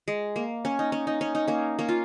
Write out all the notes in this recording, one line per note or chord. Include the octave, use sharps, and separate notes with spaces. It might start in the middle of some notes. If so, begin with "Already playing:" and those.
G#3
A#3
C#4
D#4
C#4
D#4
C#4
D#4
A#3 C#4
A#3 C#4
F4